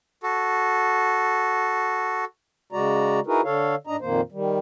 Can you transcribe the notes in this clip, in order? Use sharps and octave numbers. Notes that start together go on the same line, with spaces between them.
F#4 A4
C#3 G#3 F#4 D5 A#5
D#4 E4 F#4 G#4 A#4 B4
D3 A4 C#5 F5
G#2 D4 D#5 A#5
F2 A#2 D#3 A#3 C5
D#3 G3